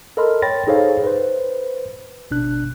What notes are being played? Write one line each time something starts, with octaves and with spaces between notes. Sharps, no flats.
A4 A#4 D#5 B5 C6 F6
C#5 G5 B5 C6 A6 A#6
D#4 G#4 A4 C5 C#5 F5
B4 C5
G#1 B2 D4 F#6